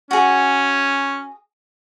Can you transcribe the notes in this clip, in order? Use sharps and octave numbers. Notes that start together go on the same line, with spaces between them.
C#4 F#4 G#4